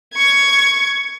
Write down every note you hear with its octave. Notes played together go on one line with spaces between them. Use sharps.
C#6 G#6